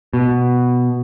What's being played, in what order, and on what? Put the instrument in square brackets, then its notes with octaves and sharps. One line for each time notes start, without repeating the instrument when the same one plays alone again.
[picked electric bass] B2